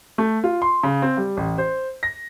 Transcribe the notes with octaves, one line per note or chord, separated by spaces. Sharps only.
A3
F4
C6
C#3
C4
G3
A1
C5
A#6